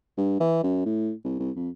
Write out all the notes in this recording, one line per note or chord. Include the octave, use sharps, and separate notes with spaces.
G2
E3
F#2
A2
C2
C2
F2